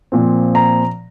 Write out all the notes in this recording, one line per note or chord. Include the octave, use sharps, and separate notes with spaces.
A#2 F3 C4
A#5